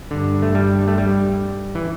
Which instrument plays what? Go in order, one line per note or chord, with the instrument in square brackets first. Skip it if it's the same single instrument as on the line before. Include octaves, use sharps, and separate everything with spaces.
[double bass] G2 [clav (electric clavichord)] D3
[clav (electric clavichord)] A3
G3
A3
G3
E3